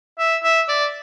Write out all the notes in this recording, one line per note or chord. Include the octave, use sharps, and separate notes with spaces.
E5
E5
D5